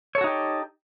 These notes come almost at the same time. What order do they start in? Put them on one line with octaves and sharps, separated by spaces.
C#5 A4 F#4 D#4 G4